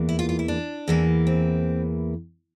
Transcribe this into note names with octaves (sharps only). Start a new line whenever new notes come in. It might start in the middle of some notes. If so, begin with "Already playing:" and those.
Already playing: E2 E3 A#3
E4
F4
F4
E4
D4
E2 E3 A#3
C4